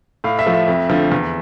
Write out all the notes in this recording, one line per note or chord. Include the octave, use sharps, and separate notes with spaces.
A2 F5
E5
F3 A3
E5
F2
D3 F3 A3
E2